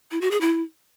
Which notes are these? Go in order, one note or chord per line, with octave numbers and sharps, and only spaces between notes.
E4
F#4
G#4
E4